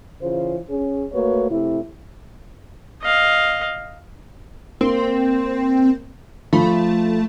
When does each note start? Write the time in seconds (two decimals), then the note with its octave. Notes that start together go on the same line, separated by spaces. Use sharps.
0.21 C#3 E3 F4 C5
0.70 C#4 G#4
1.13 A3 A#3 F#4 B4 C#5
1.50 C3 A3 E4
3.03 D#5 F5
4.81 A#3 C4
6.53 F3 A3 B5